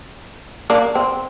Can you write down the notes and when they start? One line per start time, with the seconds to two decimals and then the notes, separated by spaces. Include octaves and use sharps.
0.70 A#3 D4
0.95 C4